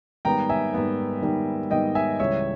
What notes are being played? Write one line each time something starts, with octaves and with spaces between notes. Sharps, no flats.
G#2 D#3 G3 B3 G5 A#5
E5 G#5
G#2 D#3 G3 B3
G#2 D#3 G3 B3
G#2 D#3 G3 B3 D#5 G5
E5 G#5
C#2 C#3 E3 G3 C#5 E5